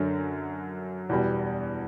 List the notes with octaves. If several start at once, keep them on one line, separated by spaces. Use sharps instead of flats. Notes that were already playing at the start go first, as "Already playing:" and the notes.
Already playing: F#2 D3 F#3
E2 B2 G3